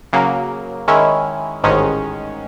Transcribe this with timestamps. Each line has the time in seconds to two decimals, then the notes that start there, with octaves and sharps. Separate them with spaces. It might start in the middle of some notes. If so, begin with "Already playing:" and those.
0.13 C#3 F#3 A#3
0.88 D#3 G#3 C#4 E4
1.64 A1 G#2 D#3 G#3 C#4